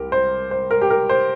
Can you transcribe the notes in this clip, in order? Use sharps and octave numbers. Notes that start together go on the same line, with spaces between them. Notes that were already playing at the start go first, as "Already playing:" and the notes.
Already playing: C2 G4 A#4
C5
C5
A#4
G4
A#4
C5